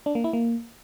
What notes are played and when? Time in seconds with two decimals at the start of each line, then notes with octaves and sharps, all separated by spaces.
0.06 D4
0.15 A#3
0.24 E4
0.33 A#3